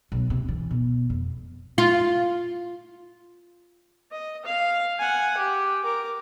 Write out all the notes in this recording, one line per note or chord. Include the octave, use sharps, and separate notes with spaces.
B1
C3
E3
B2
F2
F4
D#5
F5
F#5 G#5
G4
A#4 D6